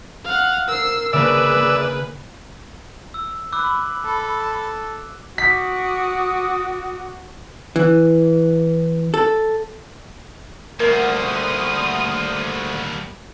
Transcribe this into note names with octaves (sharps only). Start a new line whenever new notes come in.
F5 F#5
A#4 E6 C7
C#3 A#3 D4 G#4 B4 D5 E5 E6
A#3
E6
B5 D6 E6 F#6
A4
F#4 D6 D#6 B6
E3
A4
D2 G3 A#3 A#4 C6 D#6